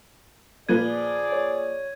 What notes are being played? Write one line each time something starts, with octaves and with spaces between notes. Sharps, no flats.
A#2 F3 G#4 B4 D5 G#6 D#7
C#5